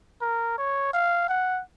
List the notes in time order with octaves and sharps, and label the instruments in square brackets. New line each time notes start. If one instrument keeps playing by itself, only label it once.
[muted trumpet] A#4
C#5
F5
F#5